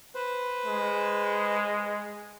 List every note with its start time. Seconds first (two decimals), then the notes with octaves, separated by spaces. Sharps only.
0.15 B4 C5
0.66 G#3